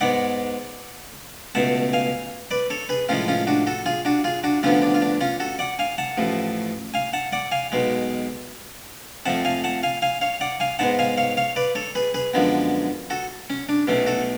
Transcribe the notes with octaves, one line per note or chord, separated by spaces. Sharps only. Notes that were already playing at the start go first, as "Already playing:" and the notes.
G#2 G#3 B3 D5 F#5
C#2 B2 A3 F#5 A5
F5 G#5
B4 D5
A4 C#5
G#4 B4
A2 F3 G#3 C#4 F4
C#4 F4
D4 F#4
F#4 A4
F4 G#4
D4 F#4
F4 G#4
D4 F#4
D2 D3 F3 B3 C#4 F4
D4
F4
D4
C#4 F4
F#4 A4
D5 F#5
F5 G#5
F#5 A5
A1 A2 F3
F5 G#5
F#5 A5
D5 F#5
F5 G#5
B1 B2 G#3
F2 F3 A3 F#5 A5
F5 G#5
F#5 A5
F5 G#5
F5 G#5
C#5 F5
D5 F#5
F5 G#5
G#2 G#3 B3 F#5 A5
F5 G#5
C#5 F5
C#5 F5
B4 D5
A4 C#5
G#4 B4
G#4 B4
F#2 D3 F3 G#3 B3
F#4 A4
C#4
D4
B1 B2 A3 C#4
F#4 A4